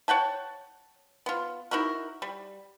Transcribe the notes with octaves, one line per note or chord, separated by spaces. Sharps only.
C#5 F#5 G5 A5
B3 F4
D#4 E4 F#4 A#4
G3